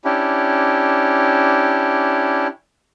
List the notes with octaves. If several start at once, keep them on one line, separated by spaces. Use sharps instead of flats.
C#4 D4 E4 G4